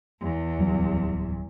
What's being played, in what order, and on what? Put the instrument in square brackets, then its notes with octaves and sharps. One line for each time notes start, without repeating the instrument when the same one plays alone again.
[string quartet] E2
[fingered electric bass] D1 F#3 G3